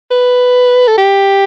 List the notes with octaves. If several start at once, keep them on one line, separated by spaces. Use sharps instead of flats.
B4
A4
G4